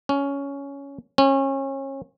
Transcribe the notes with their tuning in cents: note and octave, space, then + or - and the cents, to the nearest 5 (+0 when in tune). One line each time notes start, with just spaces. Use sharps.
C#4 +10
C#4 -30